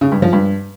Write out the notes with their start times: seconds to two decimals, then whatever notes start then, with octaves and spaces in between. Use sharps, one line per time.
0.01 C#3
0.12 G2
0.22 F3
0.33 G2